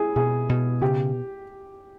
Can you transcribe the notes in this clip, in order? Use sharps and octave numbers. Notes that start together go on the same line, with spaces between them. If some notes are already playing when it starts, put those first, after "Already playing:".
Already playing: E4 G#4
B2 G#4
B2
C#3 G4